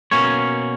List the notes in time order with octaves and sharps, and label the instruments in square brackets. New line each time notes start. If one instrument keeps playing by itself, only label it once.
[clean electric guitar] B2 A#3 C#4 C#5